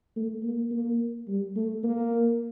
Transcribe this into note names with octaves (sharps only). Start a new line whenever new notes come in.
A3
A#3
A#3
G3
A3
A#3